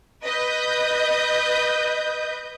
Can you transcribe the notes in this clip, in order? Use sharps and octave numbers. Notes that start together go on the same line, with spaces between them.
B4 D#5 G6